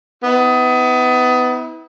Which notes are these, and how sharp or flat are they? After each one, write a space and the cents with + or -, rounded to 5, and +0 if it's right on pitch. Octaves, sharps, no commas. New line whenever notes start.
B3 +25 E4 -35